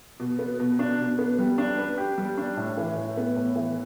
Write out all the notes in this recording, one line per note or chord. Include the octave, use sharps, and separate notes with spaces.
B2
B3
B2
D4
B2
B3
G3
D4
B4
G4
G3
D4
A2
E3
A2
B3
A2
E3